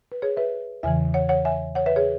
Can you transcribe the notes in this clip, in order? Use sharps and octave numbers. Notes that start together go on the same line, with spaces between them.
B4
G#4 C#5
B4 E5
E2 C#3 E3 E5 G#5
C#5 F#5
C#5 F#5
E5 G#5
C#5 F#5
B4 E5
G#4 C#5